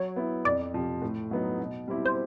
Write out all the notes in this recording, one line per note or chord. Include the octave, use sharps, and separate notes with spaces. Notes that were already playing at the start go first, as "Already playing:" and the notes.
Already playing: F#3 C#5
B3 E4
F2 D5
C3 F3
A2
F#3 B3 D#4
B2
G3 C4 E4 G4
C5